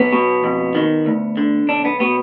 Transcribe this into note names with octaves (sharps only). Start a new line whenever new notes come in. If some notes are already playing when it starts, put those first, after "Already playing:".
Already playing: B1 B3
B2
F2
D#3
D2
D3
B1 D4
B3
B2 B3